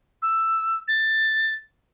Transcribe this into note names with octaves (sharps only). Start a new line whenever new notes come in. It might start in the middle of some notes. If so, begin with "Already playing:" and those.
E6
A6